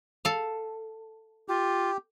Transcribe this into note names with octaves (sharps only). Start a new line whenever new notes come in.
A4 F5
F4 G4